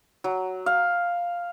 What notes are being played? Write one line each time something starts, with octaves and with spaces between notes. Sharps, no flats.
F#3
F5